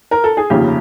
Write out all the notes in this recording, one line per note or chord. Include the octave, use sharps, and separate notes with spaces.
A#4
A4
G#4
F1 D#2 C#3 F3 G4